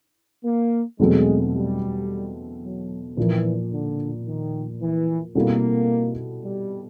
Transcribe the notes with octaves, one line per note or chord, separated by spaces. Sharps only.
A#3
E2 B2 F#3 G#3 A3 C4
G3
F#3
A#2 E3 F3 A#3
D3
D#3
E3
B2 G3 A#3 C4 E4 A4
G3